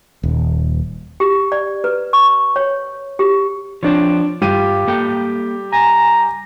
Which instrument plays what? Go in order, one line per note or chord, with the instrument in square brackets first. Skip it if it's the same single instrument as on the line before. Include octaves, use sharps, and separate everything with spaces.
[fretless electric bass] D#1
[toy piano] G4
D5
B4
C#6
C#5
G4
[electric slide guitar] F3 C4 [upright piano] D4 C#5
[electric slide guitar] G2 F4 [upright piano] G3 G4 D#7
[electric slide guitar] A#3 A4 G5
[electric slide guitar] G#5 [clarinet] A#5